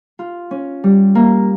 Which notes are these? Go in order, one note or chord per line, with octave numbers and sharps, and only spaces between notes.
F4
C#4
G3
A#3